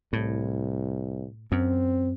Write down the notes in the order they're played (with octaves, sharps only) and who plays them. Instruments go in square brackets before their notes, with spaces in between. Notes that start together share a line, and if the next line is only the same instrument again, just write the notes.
[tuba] C2 [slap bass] A2
[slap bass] F#2 [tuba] C4